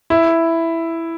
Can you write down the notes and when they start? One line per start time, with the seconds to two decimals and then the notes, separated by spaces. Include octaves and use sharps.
0.10 E4